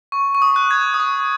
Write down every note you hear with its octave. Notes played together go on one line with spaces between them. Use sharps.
C#6
C#6
D#6
F#6
G#6
D#6
C#6